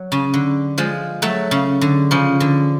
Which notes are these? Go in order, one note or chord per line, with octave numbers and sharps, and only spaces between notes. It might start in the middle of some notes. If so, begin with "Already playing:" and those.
Already playing: F#3
C#3
D3
F3 G#3
F#3 A3
C#3
D3
C#3 F3
D3